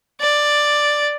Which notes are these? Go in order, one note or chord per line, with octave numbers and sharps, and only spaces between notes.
D5